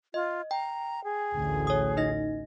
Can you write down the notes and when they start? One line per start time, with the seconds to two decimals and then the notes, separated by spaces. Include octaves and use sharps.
0.14 F4 D#5
0.51 G5 A#5
1.04 G#4
1.34 A1 D2
1.67 C#5 D#6
1.97 D#4 D#5 A#6